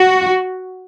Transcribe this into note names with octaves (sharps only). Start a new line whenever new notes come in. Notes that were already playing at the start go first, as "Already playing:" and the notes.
Already playing: F#4